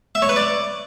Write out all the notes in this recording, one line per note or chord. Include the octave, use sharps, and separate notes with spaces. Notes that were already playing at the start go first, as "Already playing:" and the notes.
E5
C#5
B4
D5